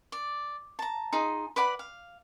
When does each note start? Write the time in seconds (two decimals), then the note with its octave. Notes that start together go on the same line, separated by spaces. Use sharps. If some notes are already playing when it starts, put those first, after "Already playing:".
0.12 D5
0.79 A5 A#5
1.13 D#4 F4 G#4
1.56 B4 D5 F#5 B5
1.79 F5